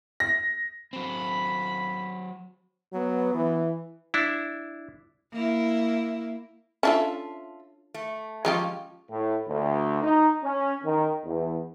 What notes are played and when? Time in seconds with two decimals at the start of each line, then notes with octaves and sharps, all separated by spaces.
0.20 A#6
0.93 F#3 C4 B5
2.93 F#3 B3
3.34 E3
4.14 D4 E4
5.33 A#3 E4
6.83 C#4 D4 F4 A4 E5 A5
7.94 A3
8.45 F3 G#3 C#4 F4 G4
9.10 A2
9.49 D2
10.03 D#4
10.44 C#4
10.84 D#3
11.26 E2